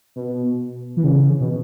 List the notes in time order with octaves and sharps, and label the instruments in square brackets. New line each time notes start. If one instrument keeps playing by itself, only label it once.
[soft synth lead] B2
E3
C#3
B2